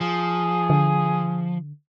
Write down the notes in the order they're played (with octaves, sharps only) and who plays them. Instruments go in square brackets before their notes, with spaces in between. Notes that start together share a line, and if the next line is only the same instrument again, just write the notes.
[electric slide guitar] F3 [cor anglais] G#4
[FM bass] D3